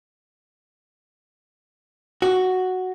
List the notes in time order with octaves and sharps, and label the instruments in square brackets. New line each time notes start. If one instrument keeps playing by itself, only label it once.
[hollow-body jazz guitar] F#4